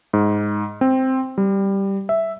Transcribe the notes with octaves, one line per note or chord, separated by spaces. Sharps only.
G#2
C4
G3
E5